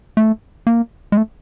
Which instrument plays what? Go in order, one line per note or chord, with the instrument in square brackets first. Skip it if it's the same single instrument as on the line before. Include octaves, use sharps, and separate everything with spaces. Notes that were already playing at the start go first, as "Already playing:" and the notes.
[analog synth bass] A3
A#3
G#3
A3